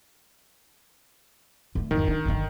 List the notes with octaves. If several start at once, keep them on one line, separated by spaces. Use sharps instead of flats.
D3 A3
G#1 F2 D#3
D4
G1 D3